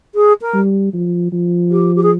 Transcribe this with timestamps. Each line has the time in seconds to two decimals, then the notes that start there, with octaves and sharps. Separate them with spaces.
0.14 G#4
0.41 A#4
0.54 G3
0.93 F3
1.32 F3
1.71 G4
1.95 G4
2.03 G#4